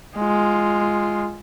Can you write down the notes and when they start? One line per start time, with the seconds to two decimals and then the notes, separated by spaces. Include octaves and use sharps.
0.17 G#3 F4